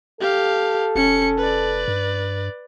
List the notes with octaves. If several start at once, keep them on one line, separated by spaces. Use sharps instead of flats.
G4 A4 F5
F1 C#4 C#7
B4 D5
G2